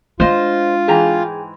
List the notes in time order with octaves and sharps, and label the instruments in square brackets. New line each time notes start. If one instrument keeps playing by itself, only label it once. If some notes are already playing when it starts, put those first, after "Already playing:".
[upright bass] G#3 D4 [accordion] F4 [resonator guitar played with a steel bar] C5 D#5
[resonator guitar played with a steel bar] G#2 E3 A#5 [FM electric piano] G#4 G5 G#5